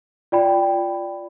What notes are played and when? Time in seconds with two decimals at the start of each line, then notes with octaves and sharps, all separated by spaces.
0.32 F4 D5 G5 B5